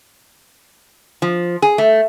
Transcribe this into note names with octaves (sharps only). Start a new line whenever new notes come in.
F3
G#4
A3